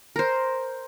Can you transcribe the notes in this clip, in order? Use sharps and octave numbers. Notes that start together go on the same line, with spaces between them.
A#4 C5